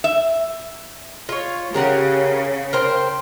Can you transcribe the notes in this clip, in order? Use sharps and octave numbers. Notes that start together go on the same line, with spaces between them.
E5
F4 C#5
C#3 G4 A#4 F#5
A#4 C5 G5